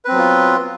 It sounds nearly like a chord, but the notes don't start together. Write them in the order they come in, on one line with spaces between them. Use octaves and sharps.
B4 C4 F#3 B3 F4